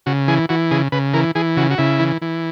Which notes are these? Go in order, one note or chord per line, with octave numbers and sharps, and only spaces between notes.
C#3 F#4
E3 G#4
E3 F#4
C#3 G#4
C#3 B4
E3 A#4
E3 G#4
C#3 F#4
F#4
C#3 E4
E3
E3